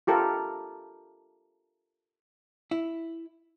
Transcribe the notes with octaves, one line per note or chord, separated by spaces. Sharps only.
F4 G4 A4 A#4
E4